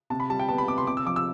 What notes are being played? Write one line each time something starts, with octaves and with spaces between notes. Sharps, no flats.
C3 A5
B5
G3 A5
G5
B3 A5
B5
C3 D6
C6
C3 D6
E6
F3 D6
E6